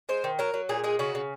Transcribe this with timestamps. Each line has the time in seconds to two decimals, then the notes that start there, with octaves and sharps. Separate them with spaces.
0.09 G#3 C5
0.24 D#3
0.39 F#3 A#4
0.54 F#3
0.69 A#2 G#4
0.84 G#3 G#4
0.99 C#3 F#4
1.15 C#3